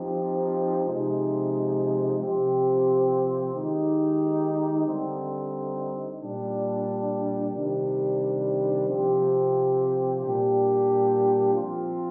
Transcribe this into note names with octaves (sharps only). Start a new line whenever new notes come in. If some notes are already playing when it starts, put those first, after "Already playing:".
Already playing: F3 C4 D#4 G4
C3 F3 G#3 D#4
C3 F3 C4 G4
D#3 G#3 D#4 G4
D3 G3 C4 D#4
A#2 G3 D4
C3 D#3 G3 D4
C3 F3 C4 G4
A#2 G3 D4 G4
F3 C4 F4